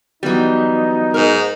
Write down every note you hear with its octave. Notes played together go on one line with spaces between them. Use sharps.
E3 F#3 G3 B3 D#4 F#4
G#2 A#4